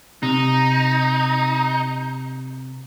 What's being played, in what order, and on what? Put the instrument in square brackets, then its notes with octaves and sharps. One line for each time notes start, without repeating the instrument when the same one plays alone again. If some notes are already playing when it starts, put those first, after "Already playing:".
[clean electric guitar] C3 [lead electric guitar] D#4